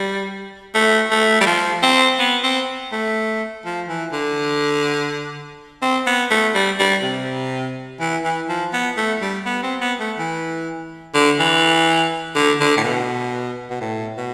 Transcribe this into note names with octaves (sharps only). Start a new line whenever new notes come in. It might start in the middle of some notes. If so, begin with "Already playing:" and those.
Already playing: G3
A3
A3
G3
F3
C4
B3
C4
A3
F3
E3
D3
C4
B3
A3
G3
G3
C3
E3
E3
F3
B3
A3
G3
B3
C4
B3
A3
E3
D3
E3
D3
D3
A2
B2
B2
A2
B2